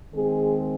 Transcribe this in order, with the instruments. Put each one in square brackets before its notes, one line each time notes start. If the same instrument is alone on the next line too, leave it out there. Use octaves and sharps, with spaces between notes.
[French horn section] D#3 G#3 C4 G#4